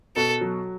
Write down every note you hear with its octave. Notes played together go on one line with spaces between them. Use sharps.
B2 A4
F#3